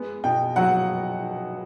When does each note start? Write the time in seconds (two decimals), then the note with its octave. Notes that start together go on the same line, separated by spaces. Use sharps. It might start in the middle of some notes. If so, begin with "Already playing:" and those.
Already playing: G#3 B3
0.24 B2 G5
0.56 F#3 F#5